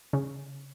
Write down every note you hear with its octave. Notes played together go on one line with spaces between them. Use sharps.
C#3